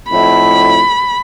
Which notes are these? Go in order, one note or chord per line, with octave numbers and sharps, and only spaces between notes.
F2 A2 B5